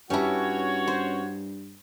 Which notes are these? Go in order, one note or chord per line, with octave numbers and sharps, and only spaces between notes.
G2 C#4 E4 F#4 G4 B4 C#5 A5
C5